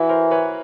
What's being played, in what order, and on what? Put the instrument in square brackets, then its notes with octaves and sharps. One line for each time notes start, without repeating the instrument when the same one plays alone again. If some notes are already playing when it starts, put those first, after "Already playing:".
Already playing: [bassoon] E3 [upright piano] E4 F#4
[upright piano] A#4 C5
B4 C#5